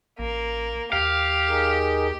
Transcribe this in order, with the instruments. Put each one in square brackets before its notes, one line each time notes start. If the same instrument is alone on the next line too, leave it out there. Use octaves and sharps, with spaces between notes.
[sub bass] A1 [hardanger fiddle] A#3
[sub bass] D#2 [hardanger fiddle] G4 [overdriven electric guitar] F5
[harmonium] D#4 G#4 A#4